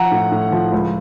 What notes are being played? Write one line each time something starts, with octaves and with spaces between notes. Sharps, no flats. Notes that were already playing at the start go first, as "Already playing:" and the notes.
Already playing: F3 F#5 A#5
A2
A2
F3
C#2